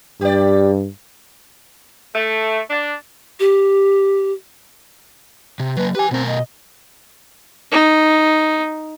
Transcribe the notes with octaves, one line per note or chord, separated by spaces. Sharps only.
G2 G4 D5
A3
D4
G4
C3
F#3 A#3 B4
G4 B4 G#5
B2 C4 A#4
D#5
D#4